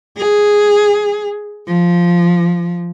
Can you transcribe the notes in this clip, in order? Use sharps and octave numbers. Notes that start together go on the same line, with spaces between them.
G#4
F3